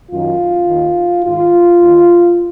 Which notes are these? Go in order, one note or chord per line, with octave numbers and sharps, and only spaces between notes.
F#2 D#3 F4
D#2 D#3
G#2 D#3 F4
D#2 D#3